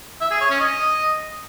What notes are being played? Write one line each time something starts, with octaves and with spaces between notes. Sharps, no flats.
E5
G#4
C#5
C#4
D#5